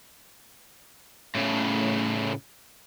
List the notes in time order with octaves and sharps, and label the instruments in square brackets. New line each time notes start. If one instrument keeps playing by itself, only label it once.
[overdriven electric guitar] A2 C#3